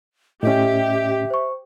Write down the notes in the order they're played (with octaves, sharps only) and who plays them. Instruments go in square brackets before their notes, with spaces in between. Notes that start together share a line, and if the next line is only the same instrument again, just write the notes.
[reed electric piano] A2 C#4 [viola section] G4 [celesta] D#5 [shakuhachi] E5
[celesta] C5 C#6